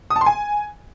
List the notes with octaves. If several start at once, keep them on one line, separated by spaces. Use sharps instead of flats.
D#6
A5
C6
G#5